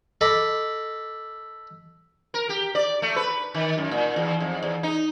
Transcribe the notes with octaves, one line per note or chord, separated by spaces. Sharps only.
A4 D#5 B5 D6
A#4
G4
D5
A3
B4
D#3
F#2
A#2
E2
F2
E2
D#4